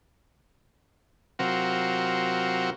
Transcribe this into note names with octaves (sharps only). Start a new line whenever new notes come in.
C3 F#3 C4 F4 F#4 A#4